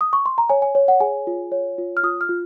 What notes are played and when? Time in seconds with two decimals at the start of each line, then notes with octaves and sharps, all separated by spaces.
0.01 D#6
0.13 C#6
0.26 C6
0.38 A#5
0.49 C#5 G#5
0.62 G#5
0.75 C#5
0.88 F#5
1.00 G#4 G#5
1.27 F4
1.52 C#5
1.78 F4
1.97 F6
2.03 F4 D#6
2.21 F6
2.29 F4